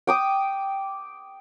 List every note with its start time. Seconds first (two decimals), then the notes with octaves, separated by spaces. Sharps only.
0.07 G5 D6 D#6